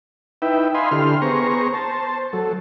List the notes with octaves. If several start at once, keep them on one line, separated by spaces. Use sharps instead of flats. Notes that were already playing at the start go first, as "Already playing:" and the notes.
D#4 E4 B4 E5 G5
D#5 F5 G#5 B5 C6
D3 E4 G4 A4 C6 F6
B3 G#4 C5 A#5 C#6
C5 A5
F#3 A4